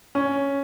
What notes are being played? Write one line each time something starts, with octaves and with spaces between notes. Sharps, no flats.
C#4